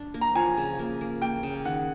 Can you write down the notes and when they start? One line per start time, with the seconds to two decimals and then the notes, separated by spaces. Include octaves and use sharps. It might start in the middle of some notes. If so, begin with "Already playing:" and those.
Already playing: D4
0.14 A#3
0.21 A#5
0.35 F3 G#5
0.57 C#3
0.79 A#3
1.01 A#3
1.22 A#3 G5
1.43 C#3
1.65 D#3 F#5